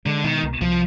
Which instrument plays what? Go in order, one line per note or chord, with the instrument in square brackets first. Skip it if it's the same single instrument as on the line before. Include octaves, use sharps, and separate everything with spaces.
[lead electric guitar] D3 [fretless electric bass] G#3
[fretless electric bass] B2 [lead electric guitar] D#3
[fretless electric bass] C2
[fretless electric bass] C2 [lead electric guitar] F3